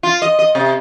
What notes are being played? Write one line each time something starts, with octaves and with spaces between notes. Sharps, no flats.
F4
D#5
D#5
C3